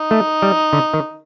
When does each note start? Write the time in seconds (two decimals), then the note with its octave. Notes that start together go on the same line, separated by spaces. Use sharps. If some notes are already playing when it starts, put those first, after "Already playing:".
Already playing: D#4
0.11 A3
0.42 G3
0.73 D3
0.94 D#3